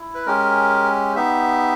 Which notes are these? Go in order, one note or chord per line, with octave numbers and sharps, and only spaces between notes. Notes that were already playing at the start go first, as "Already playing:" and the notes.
Already playing: E4
B4
G#3 C#4 G4 A#4
B3 D#4 G4 E5